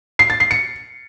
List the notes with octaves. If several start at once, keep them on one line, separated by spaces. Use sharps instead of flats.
C7
A6
C7
C#7